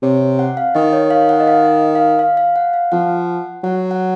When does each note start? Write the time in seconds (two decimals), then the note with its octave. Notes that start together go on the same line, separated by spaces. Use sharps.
0.02 C3 C#5
0.39 F#5
0.57 F5
0.75 D#3 D#5
0.93 C#5
1.11 F5
1.29 F#5
1.40 D#5
1.47 F5
1.95 F5
2.19 F5
2.37 F5
2.56 F#5
2.73 F5
2.92 F3 F#5
3.63 F#3 F#5
3.91 F#5